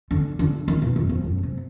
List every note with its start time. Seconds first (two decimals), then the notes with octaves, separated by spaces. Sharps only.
0.11 D3
0.39 D3
0.68 D#3
0.82 B2
0.96 F#2
1.09 F2
1.24 F#2
1.43 C3